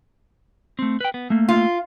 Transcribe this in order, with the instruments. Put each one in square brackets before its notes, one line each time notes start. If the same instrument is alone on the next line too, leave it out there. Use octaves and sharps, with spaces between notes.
[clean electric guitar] A3 C4
B4 G5
B3
A3 A#3
[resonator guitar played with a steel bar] F4